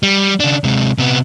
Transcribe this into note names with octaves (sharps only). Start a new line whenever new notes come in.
G3
C#3 D4
C3 G#3
C3 B3